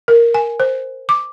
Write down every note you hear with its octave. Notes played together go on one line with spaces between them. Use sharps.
A#4
G#5
C5
D6